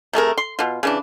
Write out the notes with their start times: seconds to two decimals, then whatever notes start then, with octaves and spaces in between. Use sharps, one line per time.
0.13 C3 A3 G#4 A#4
0.38 C6
0.59 B2 F4
0.83 C#3 E3 D4